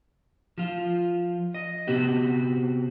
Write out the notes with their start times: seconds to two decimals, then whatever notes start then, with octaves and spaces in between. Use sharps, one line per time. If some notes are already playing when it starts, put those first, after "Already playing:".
0.58 F3 F4
1.54 D#5
1.87 C3 B3 C4 F#4 G4